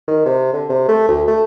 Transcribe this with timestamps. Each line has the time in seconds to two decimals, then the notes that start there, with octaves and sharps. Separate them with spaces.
0.08 D#3
0.26 C3
0.53 D3
0.70 C3
0.88 A3
1.09 D2
1.28 A3